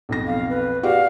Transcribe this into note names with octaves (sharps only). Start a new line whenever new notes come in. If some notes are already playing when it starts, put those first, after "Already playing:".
B1 F2 A#6
F5
B4
F#4 G4 D5 F5